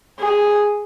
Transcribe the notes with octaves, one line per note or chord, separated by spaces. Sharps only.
G#4